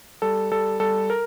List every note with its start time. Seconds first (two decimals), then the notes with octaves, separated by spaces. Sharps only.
0.22 G3 A4
0.52 G3 A4
0.80 G3 A4
1.10 A#4